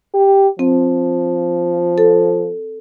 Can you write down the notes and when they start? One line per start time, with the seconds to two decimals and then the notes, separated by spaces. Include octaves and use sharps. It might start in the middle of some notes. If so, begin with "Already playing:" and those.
0.14 G4
0.59 F3 C4
1.98 A4